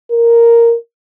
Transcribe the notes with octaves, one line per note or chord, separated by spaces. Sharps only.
A#4